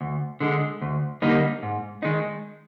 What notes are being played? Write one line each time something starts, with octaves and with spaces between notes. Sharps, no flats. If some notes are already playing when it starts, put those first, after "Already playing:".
D2
D3 G#3
D2
D3 G3 A#3 D#4
G#2
D#3 G#3 D#4